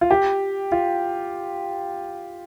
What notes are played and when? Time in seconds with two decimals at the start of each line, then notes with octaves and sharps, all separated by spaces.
0.01 F4
0.11 G4
0.72 F4